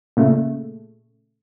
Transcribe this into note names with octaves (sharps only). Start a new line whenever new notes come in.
A#2 C#3 A3